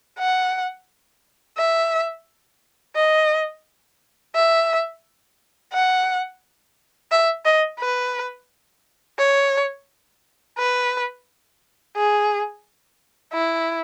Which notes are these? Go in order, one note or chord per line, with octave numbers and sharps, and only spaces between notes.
F#5
E5
D#5
E5
F#5
E5
D#5
B4
C#5
B4
G#4
E4